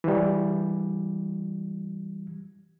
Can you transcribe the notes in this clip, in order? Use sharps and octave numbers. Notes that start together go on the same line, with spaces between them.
E3 G3